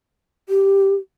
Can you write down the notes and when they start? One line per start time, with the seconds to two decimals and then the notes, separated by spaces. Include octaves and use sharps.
0.49 G4